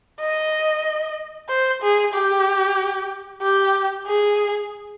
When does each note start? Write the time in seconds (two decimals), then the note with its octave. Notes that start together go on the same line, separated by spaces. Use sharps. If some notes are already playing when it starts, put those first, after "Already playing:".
0.20 D#5
1.49 C5
1.82 G#4
2.14 G4
3.42 G4
4.07 G#4